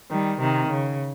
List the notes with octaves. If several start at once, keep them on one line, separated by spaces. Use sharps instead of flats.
D#3 G3
C3 D#3
C#3